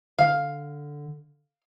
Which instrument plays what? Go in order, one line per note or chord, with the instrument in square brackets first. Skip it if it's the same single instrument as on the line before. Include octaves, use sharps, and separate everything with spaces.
[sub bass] D3 [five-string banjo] F5